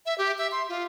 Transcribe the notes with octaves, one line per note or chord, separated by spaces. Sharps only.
E5
G4
E5
C6
F4